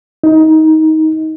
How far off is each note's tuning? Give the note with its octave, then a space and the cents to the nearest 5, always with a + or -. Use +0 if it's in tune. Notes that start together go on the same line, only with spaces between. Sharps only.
D#4 +20